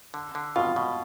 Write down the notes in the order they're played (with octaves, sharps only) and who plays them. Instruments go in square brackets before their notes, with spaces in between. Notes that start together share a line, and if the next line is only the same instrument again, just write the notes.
[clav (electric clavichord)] D3
D3
[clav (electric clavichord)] B2 [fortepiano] F4
[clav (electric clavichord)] B2